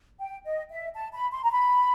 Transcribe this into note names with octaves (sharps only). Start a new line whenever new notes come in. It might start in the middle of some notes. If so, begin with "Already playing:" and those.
G5
D#5
E5
A5
B5
C6
A#5
B5